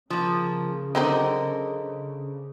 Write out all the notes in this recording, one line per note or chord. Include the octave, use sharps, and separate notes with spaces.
C#3 F3 A#3
D3 F#3 C4 D#4 A#4 C5 D#5